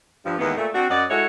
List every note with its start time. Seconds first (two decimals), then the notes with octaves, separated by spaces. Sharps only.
0.25 G2 F3
0.38 D#2 E3 G#3 B3
0.56 A#2 A3
0.74 C4 D4 F#4
0.89 F#2 F#3 D5 D#5 F#5
1.09 G#3 E4 F#4 A4 C#5